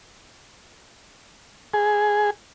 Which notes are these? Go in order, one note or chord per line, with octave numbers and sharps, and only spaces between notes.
G#4